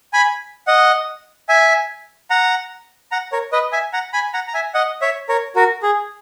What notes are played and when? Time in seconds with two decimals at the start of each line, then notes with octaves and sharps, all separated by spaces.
0.13 G#5 B5
0.67 D#5 F#5
1.49 E5 G#5
2.30 F#5 A#5
3.11 F#5 A#5
3.32 A#4 C#5
3.52 B4 D#5
3.72 E5 G#5
3.93 F#5 A#5
4.13 G#5 B5
4.34 F#5 A#5
4.47 A#5
4.54 E5 G#5
4.74 D#5 F#5
5.01 C#5 E5
5.29 A#4 C#5
5.56 F#4 A#4
5.83 G#4